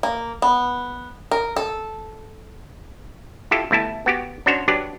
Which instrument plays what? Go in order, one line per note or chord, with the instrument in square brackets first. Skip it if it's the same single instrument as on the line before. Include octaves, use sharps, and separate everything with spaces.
[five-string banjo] A#3
B3
A#4
A4
[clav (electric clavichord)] E4 F4 G4 A4
G1 A3 E4 A5
B3 F#4 G4
C#4 D4 F#4 C5 C#5
F#3 D4 G4 B4 D5